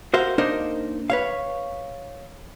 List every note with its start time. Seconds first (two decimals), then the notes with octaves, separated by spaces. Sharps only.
0.14 F#4 A#4 C5 E5 F5
0.38 A#3 D4 D#4 A#4 C5
1.10 B4 C#5 F5